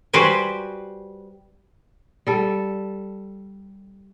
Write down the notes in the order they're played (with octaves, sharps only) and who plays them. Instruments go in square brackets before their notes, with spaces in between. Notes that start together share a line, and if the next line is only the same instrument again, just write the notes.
[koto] G3 F#4 G4 B4 C5 G#5
[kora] G3 A4